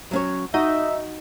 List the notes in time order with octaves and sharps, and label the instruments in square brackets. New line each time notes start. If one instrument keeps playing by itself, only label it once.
[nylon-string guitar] F#3 C#4 C#5
[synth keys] D#4 [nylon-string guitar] F#4 [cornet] E5